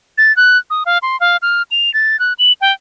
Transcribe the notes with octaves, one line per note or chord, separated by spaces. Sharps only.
A6
F#6
D#6
F5
C6
F5
F6
F7
A6
F#6
F#7
G5